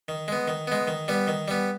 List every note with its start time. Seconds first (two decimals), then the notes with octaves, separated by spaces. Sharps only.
0.08 D#3
0.28 G#3 B3
0.48 D#3
0.67 G#3 B3
0.88 D#3
1.08 G3 B3
1.28 D#3
1.48 G3 B3